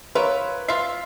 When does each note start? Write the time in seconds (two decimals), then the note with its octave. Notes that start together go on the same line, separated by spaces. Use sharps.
0.15 F4 A#4 B4 C#5 E5
0.68 F4 E5 C7